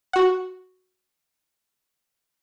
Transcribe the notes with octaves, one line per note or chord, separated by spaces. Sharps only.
F#4 F#5